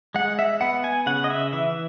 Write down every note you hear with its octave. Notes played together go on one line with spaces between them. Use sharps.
G#3 F#5
E5
B3 F#5
G#5
C#3 F#5
D#5
E5
E3 E5